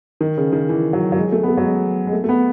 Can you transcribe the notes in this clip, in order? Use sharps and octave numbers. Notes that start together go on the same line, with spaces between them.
D#3
C#3
D#3
E3
F#3
F#3
G#3
A3
B3
A3
F#3
G#3
G#3
A3
A3
B3